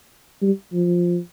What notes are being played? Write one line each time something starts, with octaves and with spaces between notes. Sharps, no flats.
G3
F3